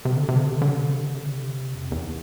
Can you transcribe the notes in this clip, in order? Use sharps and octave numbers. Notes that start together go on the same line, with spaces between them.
C3
D3
C3
D3
C3
D3
C3
D3
C3
D3
C3
F2
E2